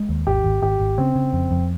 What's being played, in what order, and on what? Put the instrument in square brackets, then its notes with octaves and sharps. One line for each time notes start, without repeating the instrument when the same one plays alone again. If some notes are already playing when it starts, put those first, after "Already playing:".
Already playing: [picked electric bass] G#3
D#2
[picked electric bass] G#1 [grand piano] G4
[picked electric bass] G#1
[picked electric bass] G#1 [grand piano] G4
[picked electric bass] G#1
[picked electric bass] C#3 [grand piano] C4
[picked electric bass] C#3
F2
F2